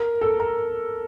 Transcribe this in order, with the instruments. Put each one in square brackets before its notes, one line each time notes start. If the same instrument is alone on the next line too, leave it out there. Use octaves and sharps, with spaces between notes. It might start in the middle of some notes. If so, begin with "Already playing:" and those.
Already playing: [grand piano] A#4
A4
A#4